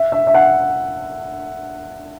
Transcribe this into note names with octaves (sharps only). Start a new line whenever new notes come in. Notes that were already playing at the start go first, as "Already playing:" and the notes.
Already playing: E5
E5
E5
F#5